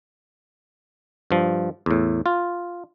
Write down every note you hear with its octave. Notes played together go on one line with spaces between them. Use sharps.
G2 F3
E2 A2
F4